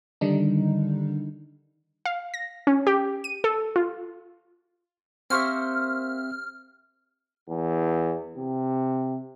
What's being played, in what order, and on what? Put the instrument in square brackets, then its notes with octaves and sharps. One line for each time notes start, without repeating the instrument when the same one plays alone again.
[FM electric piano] D3 D#3 G3 D4 D#4
[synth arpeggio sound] F5
A#6
C#4
G4
D#7
A4
F4
[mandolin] A#3 C5 C#6 [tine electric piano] C4 G4 E5 [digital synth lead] F6
[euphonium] E2
C3